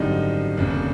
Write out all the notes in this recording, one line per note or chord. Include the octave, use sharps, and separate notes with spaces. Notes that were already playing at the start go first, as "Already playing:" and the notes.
Already playing: G#1 F#2 D3 G3 D4 D#4
F1 D#2 C#3 D4
C#4